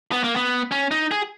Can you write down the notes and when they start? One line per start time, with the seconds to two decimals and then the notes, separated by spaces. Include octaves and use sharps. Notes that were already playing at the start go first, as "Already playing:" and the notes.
0.12 B3
0.24 A#3
0.36 B3
0.71 C#4
0.91 D#4
1.11 G#4